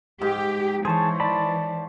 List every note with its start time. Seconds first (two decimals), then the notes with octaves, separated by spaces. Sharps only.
0.21 G#2 G4
0.85 E3 G#4 C5 C#5 A5
1.20 D5 A5 B5